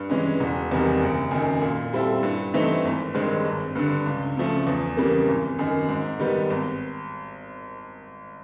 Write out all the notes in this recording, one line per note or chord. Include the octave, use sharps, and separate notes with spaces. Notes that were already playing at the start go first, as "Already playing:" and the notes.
Already playing: G2
E3 G#3 C#4
E1
E2 C3 D#3 G3
F#1
F#2 D#3
A#2
G3 C4 E4 A4
G2
E3 A3 C4 D#4
G#1
G2 D#3 G#3 C4
G#1
G2 D3
C#2
C#3 F3 A3
E2
C#3 E3 G3 A#3
G#1
F#2 D#3
G#2
D#3 G3 B3
G#1